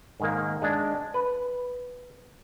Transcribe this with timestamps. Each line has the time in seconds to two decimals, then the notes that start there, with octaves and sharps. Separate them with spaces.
0.20 G#2 D#3 A#3
0.62 G#3 D4
1.14 B4